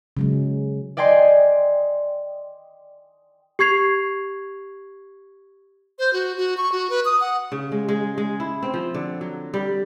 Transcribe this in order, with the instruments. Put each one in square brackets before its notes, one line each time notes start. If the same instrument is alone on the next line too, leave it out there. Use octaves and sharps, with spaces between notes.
[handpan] C#3 F#3 G#3
[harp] D5 D#5 G5 G#5 C6
[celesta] G4 C#6 G#6 C7 F7
[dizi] C5
F#4
F#4
C#6
F#4
B4
D#6
F#5
[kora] C#3
G#3
G#3
G#3
E4
C4
F3
D3
F#3
G3